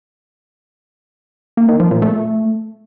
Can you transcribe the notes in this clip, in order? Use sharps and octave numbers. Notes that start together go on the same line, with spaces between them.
A#3
D#3
F3
A#2
A3